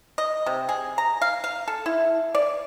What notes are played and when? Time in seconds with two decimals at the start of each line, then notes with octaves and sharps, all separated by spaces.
0.18 D#5
0.46 C3
0.69 G#4
0.98 A#5
1.22 F5
1.44 F5
1.68 A4
1.86 E4
2.35 D5